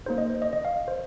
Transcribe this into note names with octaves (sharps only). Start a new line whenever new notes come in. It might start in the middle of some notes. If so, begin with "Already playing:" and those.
A#3 D#4 G#4 C5
D#5
C5
D#5
D#5
F5
C5